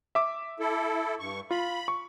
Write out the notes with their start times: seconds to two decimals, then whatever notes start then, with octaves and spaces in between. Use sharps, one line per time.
0.15 E5 D6
0.60 E4 A4
1.19 G2 C#6
1.51 F4 B5
1.88 C#6